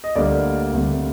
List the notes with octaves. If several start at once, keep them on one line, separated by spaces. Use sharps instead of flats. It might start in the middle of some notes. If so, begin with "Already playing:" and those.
D#5
D2 D3 G3 A#3 D5
D2 C3 G3 A#3